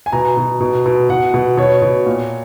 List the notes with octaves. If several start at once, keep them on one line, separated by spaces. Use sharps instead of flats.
G#5
B2 A#5
B2
B2
B2
B2 F#5
B2
B2 C#5
B2
A#2